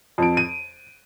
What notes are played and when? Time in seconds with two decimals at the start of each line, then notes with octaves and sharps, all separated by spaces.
0.18 F2 D7
0.37 D#7